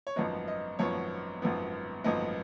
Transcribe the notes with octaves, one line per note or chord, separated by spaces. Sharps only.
C#5
G#1 F#2 F3 B3 D#5
D#5
G#1 F#2 F3 B3 C#5
G#1 F#2 F3 B3
G#1 F#2 F3 B3 D#5